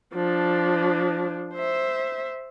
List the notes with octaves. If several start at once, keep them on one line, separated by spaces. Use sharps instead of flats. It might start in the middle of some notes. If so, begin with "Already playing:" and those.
F3 D4
C5 E5